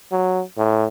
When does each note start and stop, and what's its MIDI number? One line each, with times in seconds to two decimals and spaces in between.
0.12 0.42 54
0.58 0.87 45